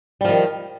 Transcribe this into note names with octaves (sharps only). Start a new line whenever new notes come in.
D#3 F3 G3